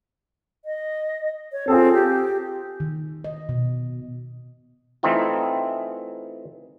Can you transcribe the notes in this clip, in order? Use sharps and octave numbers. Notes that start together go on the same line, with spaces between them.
D#5
C#5
C4 F4 G#4 A4
G4
D#3
D#5
B2
E3 A3 C4 D#4 F4